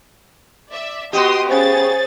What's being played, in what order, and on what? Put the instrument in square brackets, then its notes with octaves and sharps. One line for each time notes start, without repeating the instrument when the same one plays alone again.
[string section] D5 E5
[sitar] B3 F#4 G4 [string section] D#5 C6 D#6
[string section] C#3 G#4 A6 [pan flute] C5